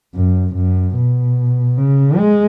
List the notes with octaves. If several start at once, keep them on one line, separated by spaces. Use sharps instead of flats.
F#2
F#2
B2
C#3
G#3